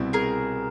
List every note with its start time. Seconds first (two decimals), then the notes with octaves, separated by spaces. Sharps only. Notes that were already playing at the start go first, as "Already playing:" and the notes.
Already playing: C2 B2 G3 C4 E4
0.13 G#4 A#4